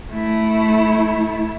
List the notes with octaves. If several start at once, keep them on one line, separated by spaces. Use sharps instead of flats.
A3 E4